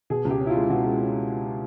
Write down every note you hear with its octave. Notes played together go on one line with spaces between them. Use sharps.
B2 G#4
C#2
G4
C#4
E4
F4
G#3
B2 F#4
G#3
C#4